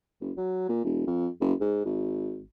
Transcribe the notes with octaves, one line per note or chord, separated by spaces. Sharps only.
F#1
F#3
A#2
E1
F2
F#1
G#2
G#1